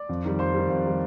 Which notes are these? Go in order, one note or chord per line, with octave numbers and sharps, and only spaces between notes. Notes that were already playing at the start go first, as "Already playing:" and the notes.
Already playing: D5 D6
F2
D#3 G3
F2 C5 C6
D#3 G3
F2
D#3 G3